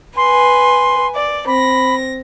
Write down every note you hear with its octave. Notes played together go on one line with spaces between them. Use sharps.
B4 G#5 C6
D5
C4 B5 A#6